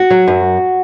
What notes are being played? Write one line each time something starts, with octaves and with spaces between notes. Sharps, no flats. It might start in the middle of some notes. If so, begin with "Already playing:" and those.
Already playing: F#4
F#3
F#2